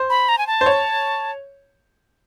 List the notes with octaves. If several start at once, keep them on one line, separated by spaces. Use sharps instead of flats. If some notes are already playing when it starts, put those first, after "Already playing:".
Already playing: C5
B5
A#5
G#5
A5
C5
C#5